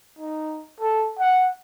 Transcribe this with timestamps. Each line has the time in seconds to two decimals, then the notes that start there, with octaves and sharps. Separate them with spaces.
0.19 D#4
0.80 A4
1.19 F#5